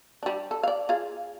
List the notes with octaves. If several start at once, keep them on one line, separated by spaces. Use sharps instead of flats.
G3 D4
A4
D5 F5
F4 G#4 F5